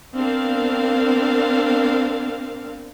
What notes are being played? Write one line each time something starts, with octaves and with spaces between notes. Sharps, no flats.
B3 C4 D4 A#4 F5